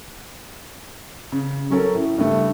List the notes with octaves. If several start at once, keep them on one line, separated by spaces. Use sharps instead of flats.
C#3
F#3 C#4 A4 A#4
A2
G2 C#3 A3